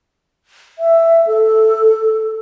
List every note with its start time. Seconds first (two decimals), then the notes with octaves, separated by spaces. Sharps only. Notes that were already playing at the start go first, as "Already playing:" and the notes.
0.79 E5
1.27 A4